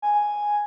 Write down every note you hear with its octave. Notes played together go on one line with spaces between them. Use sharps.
G#5